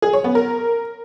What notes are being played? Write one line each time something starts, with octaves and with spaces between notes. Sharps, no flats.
G#4
C#5
B3
A#4